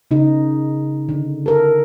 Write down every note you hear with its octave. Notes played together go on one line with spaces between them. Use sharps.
C#3 D#4
D3
A4 A#4